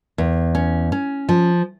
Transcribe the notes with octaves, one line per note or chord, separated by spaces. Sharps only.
E2
C#4
C#4
F3